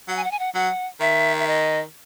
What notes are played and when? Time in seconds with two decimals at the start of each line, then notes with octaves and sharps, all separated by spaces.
0.08 F#3 F#5
0.17 G#5
0.24 F#5
0.31 G#5
0.39 F#5
0.55 F#3 F#5
1.00 D#3 E5
1.39 E5
1.47 D#5